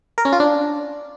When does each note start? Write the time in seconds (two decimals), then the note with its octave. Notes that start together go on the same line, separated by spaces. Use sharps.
0.18 A#4
0.25 C#4
0.33 F4
0.40 D4